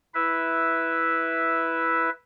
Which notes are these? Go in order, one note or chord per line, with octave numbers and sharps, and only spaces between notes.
E4 B4 E5